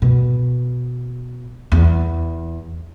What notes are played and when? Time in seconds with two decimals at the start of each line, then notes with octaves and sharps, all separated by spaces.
0.02 B2
1.72 E2